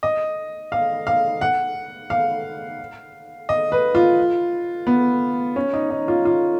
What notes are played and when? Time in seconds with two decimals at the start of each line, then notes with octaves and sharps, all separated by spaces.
0.03 D#5
0.72 F5
1.07 F5
1.41 F#5
2.10 F5
3.49 D#5
3.72 B4
3.95 F4
4.87 B3
5.56 C#4
5.73 D#4
5.90 D#4
6.08 F4
6.25 F4